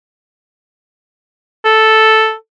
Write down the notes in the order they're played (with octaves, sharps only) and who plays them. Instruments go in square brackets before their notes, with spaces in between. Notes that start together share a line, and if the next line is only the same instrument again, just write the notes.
[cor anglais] A4